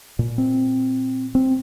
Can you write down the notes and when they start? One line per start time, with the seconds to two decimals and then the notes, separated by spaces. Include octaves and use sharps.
0.19 A#2
0.38 C4
1.35 C4